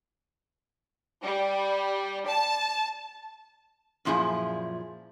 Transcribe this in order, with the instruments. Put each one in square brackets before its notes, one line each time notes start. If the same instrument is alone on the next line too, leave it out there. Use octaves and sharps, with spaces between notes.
[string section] G3
A5
[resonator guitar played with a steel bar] F#2 A#2 F3 E4 G#4